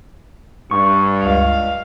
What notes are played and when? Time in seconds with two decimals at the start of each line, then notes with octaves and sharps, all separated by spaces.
0.71 G2 C#6
1.23 C#2 F5